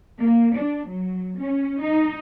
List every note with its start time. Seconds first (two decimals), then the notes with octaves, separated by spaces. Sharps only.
0.22 A#3
0.57 D4
0.89 F#3
1.39 C#4
1.83 D#4